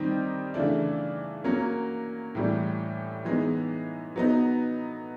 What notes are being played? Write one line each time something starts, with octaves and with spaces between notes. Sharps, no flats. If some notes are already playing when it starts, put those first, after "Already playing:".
Already playing: D#3 G3 C4 D#4
C#3 E3 A3 D4
F#3 A#3 C#4
A2 E3 G3
E3 G#3 B3 D#4
F#3 B3 D#4